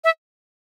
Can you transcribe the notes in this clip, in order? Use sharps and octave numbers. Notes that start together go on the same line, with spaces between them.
E5